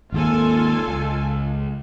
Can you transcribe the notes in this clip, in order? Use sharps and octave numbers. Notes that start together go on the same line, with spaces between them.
G#1 D#2 A#3 F4 A4 G#5
C#2